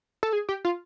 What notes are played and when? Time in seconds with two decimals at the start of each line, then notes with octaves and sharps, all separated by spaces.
0.23 A4
0.33 G#4
0.49 G4
0.65 F4